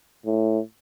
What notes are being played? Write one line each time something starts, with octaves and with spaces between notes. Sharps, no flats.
A2